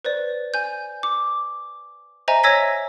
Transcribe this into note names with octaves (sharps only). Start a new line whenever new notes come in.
B4 C5 D5
G#5 G6
D6
C5 D#5 E5 G#5 A#5
C#5 G#5 E6 G#6 A#6 B6